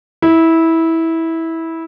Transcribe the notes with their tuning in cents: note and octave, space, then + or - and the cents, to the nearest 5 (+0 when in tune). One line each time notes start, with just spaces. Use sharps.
E4 -15